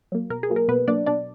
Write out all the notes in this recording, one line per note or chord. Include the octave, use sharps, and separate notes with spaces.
F#3 A#3
B2 A#4
G#4
F#3 A#3
A#4
B2 B3 B4
F#3 A#3 D4 D5
B2 D4 D5